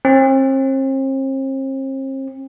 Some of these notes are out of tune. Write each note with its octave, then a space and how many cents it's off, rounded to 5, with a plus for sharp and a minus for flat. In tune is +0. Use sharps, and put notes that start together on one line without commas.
C4 +40